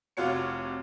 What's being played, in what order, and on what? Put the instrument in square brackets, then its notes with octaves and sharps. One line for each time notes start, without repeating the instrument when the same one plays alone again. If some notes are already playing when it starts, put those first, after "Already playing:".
[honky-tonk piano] F1 C3 F4 F#4 C#5 C#7